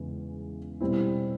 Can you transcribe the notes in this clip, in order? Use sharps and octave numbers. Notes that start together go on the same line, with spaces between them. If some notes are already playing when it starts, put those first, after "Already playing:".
Already playing: E2 C#3 E3 G#3
B2 G3 C4 E4